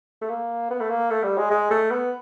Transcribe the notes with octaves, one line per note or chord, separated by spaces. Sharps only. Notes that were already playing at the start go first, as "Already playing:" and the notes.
A3
A#3
B3
A3
A#3
A3
G3
G#3
G#3
A3
B3